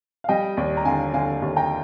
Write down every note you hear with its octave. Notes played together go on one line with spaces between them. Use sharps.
F5
G3 D#5 G5
D#2 D5
A#5
D3 F5 G#5
D3 F5 G#5
D#2
G5 A#5